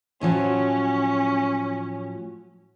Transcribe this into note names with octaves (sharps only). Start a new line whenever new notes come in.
A2 F3 F#3 C#4